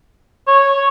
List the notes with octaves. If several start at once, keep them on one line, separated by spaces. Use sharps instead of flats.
C#5